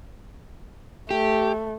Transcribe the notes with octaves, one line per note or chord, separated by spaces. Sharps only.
A3 G4